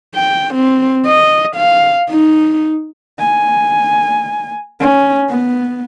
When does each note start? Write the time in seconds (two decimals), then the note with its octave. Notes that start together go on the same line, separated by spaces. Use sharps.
0.15 G5
0.54 C4
1.06 D#5
1.56 F5
2.10 D#4
3.20 G#5
4.80 C#4
5.29 B3